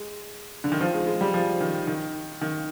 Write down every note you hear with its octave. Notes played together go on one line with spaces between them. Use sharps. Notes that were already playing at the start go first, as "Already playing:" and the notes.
Already playing: G#3
D3
D#3
F3
G#3
G#3
G3
F3
D#3
D#3
D#3